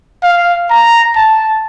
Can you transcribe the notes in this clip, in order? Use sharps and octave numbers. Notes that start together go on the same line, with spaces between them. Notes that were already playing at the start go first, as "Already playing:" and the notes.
F5
A#5
A5